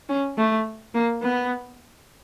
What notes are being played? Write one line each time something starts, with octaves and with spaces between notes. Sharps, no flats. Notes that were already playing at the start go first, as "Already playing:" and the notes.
C#4
A3
A#3
B3